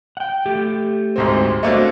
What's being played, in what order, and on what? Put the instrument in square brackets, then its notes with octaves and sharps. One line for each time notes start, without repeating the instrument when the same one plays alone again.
[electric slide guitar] F#5 G5
A3 G4
[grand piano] D2 G#2 C4
[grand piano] A3 A#3 C4 [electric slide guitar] D4 F#4 D#5